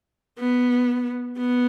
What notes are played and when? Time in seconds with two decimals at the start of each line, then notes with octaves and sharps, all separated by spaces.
0.39 B3
1.38 B3